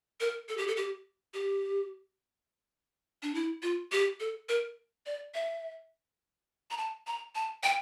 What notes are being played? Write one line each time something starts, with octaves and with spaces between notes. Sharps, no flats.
A#4
A4
G4
A4
G4
G4
D4
E4
F4
G4
A4
A#4
D5
E5
A#5
A5
A#5
A5
G5